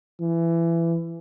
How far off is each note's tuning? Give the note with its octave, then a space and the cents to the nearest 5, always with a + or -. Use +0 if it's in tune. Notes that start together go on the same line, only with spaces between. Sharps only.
E3 +20